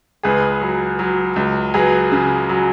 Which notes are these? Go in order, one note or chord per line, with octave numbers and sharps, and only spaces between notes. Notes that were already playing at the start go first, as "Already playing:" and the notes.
C#2 G#4 B4
F#3
F#3
C#2
F#3 G#4 B4
C#3
F#3